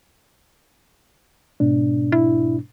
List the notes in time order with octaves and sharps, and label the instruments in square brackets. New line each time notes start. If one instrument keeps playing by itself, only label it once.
[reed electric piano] G#2 B2 D4
[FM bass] E4